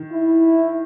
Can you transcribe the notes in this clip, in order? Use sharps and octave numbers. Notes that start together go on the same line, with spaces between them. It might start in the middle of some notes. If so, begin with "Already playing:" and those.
Already playing: D#3
E4